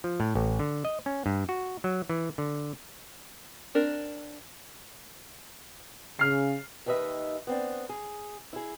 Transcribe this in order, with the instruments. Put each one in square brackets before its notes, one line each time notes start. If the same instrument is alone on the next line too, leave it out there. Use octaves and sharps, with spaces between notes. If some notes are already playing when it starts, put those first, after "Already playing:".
[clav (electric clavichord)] F3
A2
A1
D3
D#5
C#4
G2
F#4
F#3
E3
D3
[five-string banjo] C4 D4 A#4
[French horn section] C#3 [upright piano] F6 C7
[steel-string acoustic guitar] D#2 D#3 B4 D#5 E5
B3 C4 D4
G#4
E4 G#4